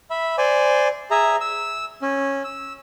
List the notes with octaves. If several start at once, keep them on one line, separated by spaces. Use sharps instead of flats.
E5 B5
C5 D5 G#5
G#4 E5 A#5
E6
C#4
E6